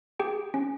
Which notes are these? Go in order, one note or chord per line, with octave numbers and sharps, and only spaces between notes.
G4 G#4 G5
C#4